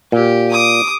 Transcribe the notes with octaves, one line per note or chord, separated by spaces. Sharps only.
A#2 G4
D6 D#6